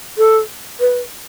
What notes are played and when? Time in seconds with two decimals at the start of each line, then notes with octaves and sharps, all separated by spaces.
0.18 A4
0.80 B4